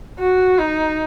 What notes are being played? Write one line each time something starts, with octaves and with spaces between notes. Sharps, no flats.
F#4
D#4